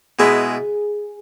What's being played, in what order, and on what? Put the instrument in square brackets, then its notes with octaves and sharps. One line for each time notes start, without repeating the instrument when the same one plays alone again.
[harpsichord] B2 G#3 E4 B4 [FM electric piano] G#4